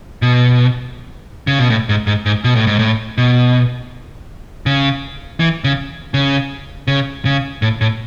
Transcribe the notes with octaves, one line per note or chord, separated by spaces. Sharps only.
B2
C#3
B2
A2
G#2
G#2
G#2
B2
A2
G#2
A2
B2
C#3
E3
C#3
C#3
C#3
C#3
A2
A2